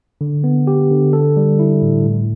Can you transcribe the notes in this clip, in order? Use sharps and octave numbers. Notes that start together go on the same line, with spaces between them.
D3
B3
G4
D3
A4
G3
E4
A2
A2